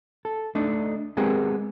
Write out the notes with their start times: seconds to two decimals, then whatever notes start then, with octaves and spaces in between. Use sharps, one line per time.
0.25 A4
0.55 A3 D4 D#4
1.17 G#3 B3 C4 G4 G#4 A#4